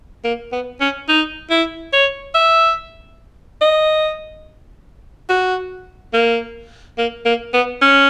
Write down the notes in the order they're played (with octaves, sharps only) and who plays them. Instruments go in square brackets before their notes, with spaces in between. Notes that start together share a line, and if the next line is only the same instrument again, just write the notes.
[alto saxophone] A#3
B3
C#4
D#4
E4
C#5
E5
D#5
F#4
A#3
A#3
A#3
B3
C#4